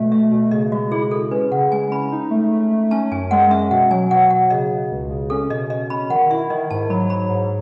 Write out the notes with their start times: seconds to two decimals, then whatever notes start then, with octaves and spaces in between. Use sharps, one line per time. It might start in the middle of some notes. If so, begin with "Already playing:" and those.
Already playing: B2 A3
0.11 A3 E5
0.31 B2
0.51 C#3 D#5
0.71 G#3 F#4
0.91 E4 G#4
1.02 G#4
1.11 E4 A4
1.31 C#4 B4
1.51 C#3 F#5
1.72 G#3 G#5
1.91 C#4 B5
2.12 D#4
2.31 A3
2.52 A3
2.71 A3
2.91 C#4 A5
3.11 F#2 G#5
3.31 G#3 F#5
3.51 C#4 E5
3.70 B2 F#5
3.90 F#3 G#5
4.11 B2 F#5
4.30 B2 F#5
4.50 C#3 D#5
4.71 C#3
4.91 C#2
5.10 C#3
5.30 C#4 A4
5.50 B2 D#5
5.70 B2 D#5
5.90 C#4 B5
6.10 D#3 F#5
6.31 E4 E5
6.50 D#3 D#5
6.70 G#2 A5
6.90 F#3 B5
7.10 F#3 B5
7.30 G#2